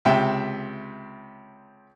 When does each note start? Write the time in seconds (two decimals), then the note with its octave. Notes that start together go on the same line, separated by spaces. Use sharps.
0.05 C#2 C3 E5 G5